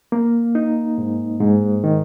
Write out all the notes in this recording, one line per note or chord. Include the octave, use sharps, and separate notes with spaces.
A#3
D#4
G#2
G#2
D#3